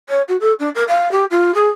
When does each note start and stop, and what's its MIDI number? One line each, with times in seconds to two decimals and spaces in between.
0.09 0.21 73
0.28 0.36 66
0.40 0.52 69
0.59 0.69 62
0.75 0.83 70
0.88 1.10 77
1.11 1.24 67
1.31 1.54 65
1.54 1.68 68